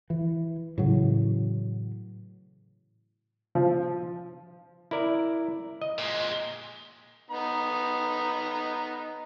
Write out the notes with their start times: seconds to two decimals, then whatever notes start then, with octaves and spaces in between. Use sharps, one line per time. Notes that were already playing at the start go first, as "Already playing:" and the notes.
0.10 E3
0.78 A2 C#3 E3 F#3
3.55 F3
4.91 E4 A#4 D5
5.81 D#5
5.98 A#2 G#3
7.30 B3 D#4 A#5